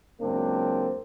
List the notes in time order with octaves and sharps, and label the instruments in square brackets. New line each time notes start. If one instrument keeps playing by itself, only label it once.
[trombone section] C#2 F#2 A#3 C4 D4